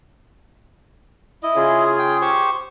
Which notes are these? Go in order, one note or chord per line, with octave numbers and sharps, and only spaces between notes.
E4 D#5
C#3 F4 G#4
G5
G4 C5 C#6